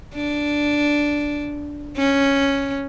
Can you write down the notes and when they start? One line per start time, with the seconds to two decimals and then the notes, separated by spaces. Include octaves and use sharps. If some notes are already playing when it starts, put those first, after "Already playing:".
0.15 D4
1.97 C#4